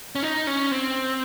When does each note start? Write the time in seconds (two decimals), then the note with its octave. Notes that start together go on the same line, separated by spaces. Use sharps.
0.15 C#4
0.23 D#4
0.47 C#4
0.71 C4